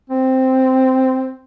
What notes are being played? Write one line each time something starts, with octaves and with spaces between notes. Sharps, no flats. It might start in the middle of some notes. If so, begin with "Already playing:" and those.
C4